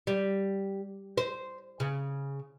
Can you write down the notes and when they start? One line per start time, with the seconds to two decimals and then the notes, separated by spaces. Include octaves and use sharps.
0.07 G3
1.18 C5
1.80 C#3